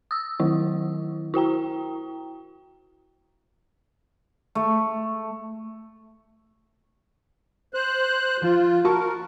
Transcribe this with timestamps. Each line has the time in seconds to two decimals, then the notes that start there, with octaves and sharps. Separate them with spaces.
0.11 D#6 E6
0.40 D#3 F#3 A3 E4
1.34 E4 F#4 G5 A#5
4.55 A3
7.74 C5 F#6
8.42 F3 F4
8.84 F#4 A#4 A5 C#6